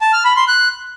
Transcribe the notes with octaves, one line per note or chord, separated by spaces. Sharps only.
A5
F6
B5
C6
F#6